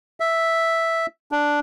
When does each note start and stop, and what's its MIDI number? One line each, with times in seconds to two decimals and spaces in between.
0.20 1.06 76
1.32 1.60 62